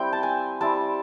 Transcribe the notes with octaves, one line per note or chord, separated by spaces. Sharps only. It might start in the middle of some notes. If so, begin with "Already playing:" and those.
Already playing: G3 C4 E4 G5
A5
G#5
G3 C4 E4 A5